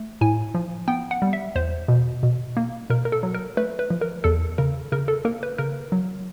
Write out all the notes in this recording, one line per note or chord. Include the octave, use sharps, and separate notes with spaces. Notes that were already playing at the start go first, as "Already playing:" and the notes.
Already playing: A3
A2 G#5
F3
B3 G5
F#5
G3
E5
E2 C5
B2
B2
A#3
B2 A#4
A#4
A4
F#3
A#4
A3 B4
B4
F3
A#4
E2 A4
C#3 A#4
C#3 A#4
A4
A#3 A#4
B4
C#3 A#4
F#3